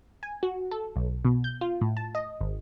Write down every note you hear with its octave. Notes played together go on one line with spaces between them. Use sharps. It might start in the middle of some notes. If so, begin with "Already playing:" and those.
G#5
F#4
A4
B1
B2
G6
F4
A2
A5
D#5
G#1